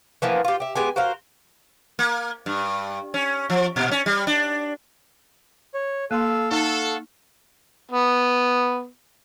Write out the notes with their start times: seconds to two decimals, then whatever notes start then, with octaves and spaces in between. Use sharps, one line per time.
0.22 E3 F3 A#3 B3
0.45 F4 G4
0.60 G4 E5
0.75 G#3 B3 G4 G#5
0.96 F#4 A#4 C5 F5
1.99 A#3
2.46 G2
3.14 C#4
3.50 F3
3.76 A#2
3.91 C#4
4.06 G3
4.27 D4
5.74 C#5
6.11 A#3 A4 F5 C6 E6
6.51 D#4 A4 F5 F#5 C#6
7.92 B3